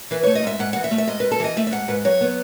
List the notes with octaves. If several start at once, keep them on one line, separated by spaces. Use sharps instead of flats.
E3 B4
A3 C#5
D#5
G#2 E5
G#2 F#5
E3 F#5
E5
A3
E5
G#2 D#5
G#2 B4
A4
E3 D#5
A3 E5
E5
G#2 F#5
G#2 B4
F#3 C#5
B3